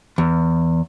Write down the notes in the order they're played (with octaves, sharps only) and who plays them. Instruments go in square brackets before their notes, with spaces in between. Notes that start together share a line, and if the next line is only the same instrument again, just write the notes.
[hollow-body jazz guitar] E2